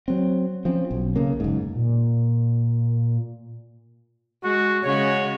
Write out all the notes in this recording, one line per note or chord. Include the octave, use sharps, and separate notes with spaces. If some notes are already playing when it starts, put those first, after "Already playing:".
F#3 C4
F3 C4 C#4
B1
C#3 A#3
F#1 G#2
A#2
G#3 F#4
C#3 G#3 F#4 C#5